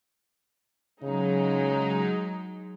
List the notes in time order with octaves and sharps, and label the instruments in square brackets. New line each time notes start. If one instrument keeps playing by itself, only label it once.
[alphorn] C#3 [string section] F#3 G#3 D#4